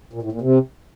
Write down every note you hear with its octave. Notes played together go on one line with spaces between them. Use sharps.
A#2
A2
A#2
C3